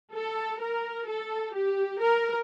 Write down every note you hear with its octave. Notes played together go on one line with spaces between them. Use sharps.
A4
A#4
A4
G4
A#4